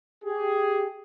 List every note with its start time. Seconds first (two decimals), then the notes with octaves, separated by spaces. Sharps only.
0.24 G4 G#4